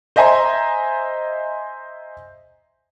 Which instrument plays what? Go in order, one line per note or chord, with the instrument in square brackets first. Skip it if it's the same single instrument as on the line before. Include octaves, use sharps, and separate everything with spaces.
[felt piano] C5 D#5 E5 G#5 A#5 C6